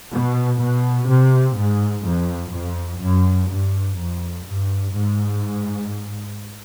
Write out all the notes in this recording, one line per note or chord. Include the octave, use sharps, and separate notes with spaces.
B2
B2
C3
G#2
F2
F2
F#2
G2
F2
G2
G#2